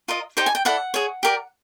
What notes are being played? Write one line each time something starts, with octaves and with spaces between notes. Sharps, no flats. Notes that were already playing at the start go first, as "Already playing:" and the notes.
F4 A#4 D#5
D#4 G4 C5 G5
G#5
G5
E4 A4 D5 F#5
G#4 C#5
G4 A#4 D5